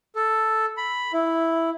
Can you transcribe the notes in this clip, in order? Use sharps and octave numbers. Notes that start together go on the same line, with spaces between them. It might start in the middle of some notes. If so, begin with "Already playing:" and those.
A4
B5
E4